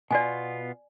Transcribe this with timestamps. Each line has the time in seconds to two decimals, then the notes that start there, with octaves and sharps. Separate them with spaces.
0.11 B2 B3 F4 D5 G#5